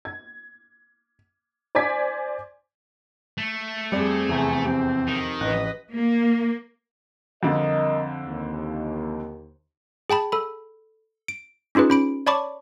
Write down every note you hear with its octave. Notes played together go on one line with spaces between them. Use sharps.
G#6
C5 D5 G#5 D6 G#6 B6
A3
F2 G3 C4 G#4 D5 C#7
E2 C3 G4 G#5 A#5
C4 G4
D#3
A1 B4 D#5 F#6
A#3
F2 D3 G3 A#4 D#5
D#2
G#4 G5 A5 B5
A4 B5
D7
C#4 D#4 F4 G#4 B4
C#4 B5 D7
C#5 D5 A5 B5 C#6 D6